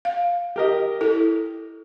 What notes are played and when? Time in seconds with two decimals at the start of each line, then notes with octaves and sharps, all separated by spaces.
0.05 F5
0.56 G4 A#4 D#5
1.01 E4 A4